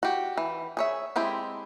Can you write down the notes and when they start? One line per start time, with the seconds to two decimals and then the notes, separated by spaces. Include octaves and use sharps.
0.03 F#4 G4
0.37 E3
0.77 G#4 C#5 E5
1.16 G#3 C4 E4 G4